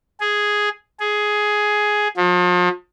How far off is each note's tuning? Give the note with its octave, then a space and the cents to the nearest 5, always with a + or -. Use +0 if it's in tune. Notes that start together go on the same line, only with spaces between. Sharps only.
G#4 +0
G#4 +10
F3 +40